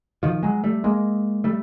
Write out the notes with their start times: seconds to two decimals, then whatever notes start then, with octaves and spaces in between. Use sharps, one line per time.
0.23 D#3 F3
0.43 F#3 G#3
0.64 G3 A3
0.84 G#3 A#3
1.44 G3 A3